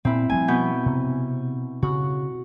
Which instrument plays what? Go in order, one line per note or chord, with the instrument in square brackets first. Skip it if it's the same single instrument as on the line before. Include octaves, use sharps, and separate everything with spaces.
[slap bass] A#2 [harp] C4 E4
[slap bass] F3 G3 A3 [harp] G#5
[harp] B2 B3 G6
[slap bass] C3
[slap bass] C#3 [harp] F#4